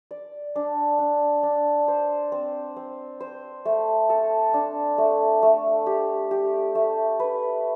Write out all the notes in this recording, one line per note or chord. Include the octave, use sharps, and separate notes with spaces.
D5
D4
D4
D4
C5
C4
C4
C5
A3
A4
D4
A3
A3
G4
G4
A3
B4